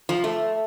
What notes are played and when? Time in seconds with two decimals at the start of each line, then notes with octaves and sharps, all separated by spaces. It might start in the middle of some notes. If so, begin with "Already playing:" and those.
0.09 F3
0.24 A3